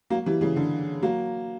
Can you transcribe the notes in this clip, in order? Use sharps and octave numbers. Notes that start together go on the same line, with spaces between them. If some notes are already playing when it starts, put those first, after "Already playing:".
F#3 A#3
E3 G3
C#3 E3
D3
F#3 A#3